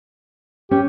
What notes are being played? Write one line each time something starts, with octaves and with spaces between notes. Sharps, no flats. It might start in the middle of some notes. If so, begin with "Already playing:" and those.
C#4 G4